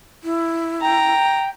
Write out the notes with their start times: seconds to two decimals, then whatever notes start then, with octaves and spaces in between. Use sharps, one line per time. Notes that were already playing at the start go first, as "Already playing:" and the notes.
0.24 E4
0.82 G5 A#5